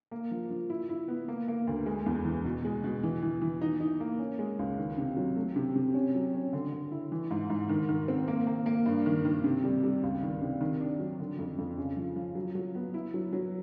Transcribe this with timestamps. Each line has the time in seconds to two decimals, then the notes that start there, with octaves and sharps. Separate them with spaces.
0.11 A#3
0.31 F3
0.50 F3
0.70 E4
0.89 E4
1.08 B3
1.28 A#3
1.48 A#3
1.67 D2
1.86 G#3
2.06 E2
2.25 E3
2.45 B2
2.65 G#3
2.84 B2
3.03 E3
3.22 E3
3.42 E3
3.61 D#4
3.81 D#4
4.00 A#3
4.19 C#4
4.39 G#3
4.59 C#2
4.78 D#3
4.98 C3
5.17 F#3
5.36 A3
5.56 C3
5.75 C3
5.94 C#4
6.15 F#3
6.34 C#4
6.53 D3
6.72 D3
6.91 E4
7.12 E3
7.31 G#2
7.50 G#2
7.69 D#3
7.89 D#3
8.08 C4
8.28 A#3
8.47 A#3
8.66 A#3
8.86 G2
9.06 D#3
9.25 D#3
9.44 C3
9.64 G3
9.83 G3
10.03 C#2
10.22 D#3
10.42 C3
10.61 D#3
10.80 D4
10.99 F#3
11.20 D3
11.39 F2
11.58 F2
11.78 C#3
11.97 F3
12.16 F3
12.35 F#3
12.55 F#3
12.75 B3
12.94 E4
13.14 F#3
13.33 F#3